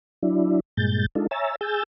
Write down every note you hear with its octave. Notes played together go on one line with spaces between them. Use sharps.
F#3 D4 E4
G2 A#2 G#3 G6 A6
G#3 D4 D#4 F4 A4
C#5 E5 G#5 A#5 E6 A6
G#4 G#5 E6 G6 A6